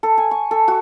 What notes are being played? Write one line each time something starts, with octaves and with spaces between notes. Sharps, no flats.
A4
G#5
C#6
A4
F#4